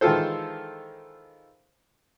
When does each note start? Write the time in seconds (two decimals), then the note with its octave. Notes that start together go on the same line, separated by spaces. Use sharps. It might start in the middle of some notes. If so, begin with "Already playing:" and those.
0.01 D#3 E3 G#3 F4 A4 C5